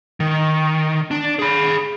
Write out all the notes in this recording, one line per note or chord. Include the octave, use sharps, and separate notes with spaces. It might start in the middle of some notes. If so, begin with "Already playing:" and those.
D#3
D4
G#4 B5